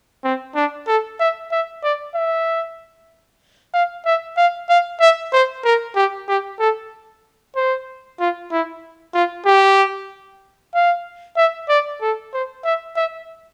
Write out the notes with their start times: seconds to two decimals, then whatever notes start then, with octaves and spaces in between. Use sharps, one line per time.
0.25 C4
0.56 D4
0.88 A4
1.20 E5
1.52 E5
1.84 D5
2.15 E5
3.74 F5
4.06 E5
4.37 F5
4.70 F5
5.01 E5
5.33 C5
5.65 A#4
5.96 G4
6.29 G4
6.60 A4
7.56 C5
8.20 F4
8.52 E4
9.14 F4
9.46 G4
10.75 F5
11.37 E5
11.69 D5
12.02 A4
12.33 C5
12.65 E5
12.96 E5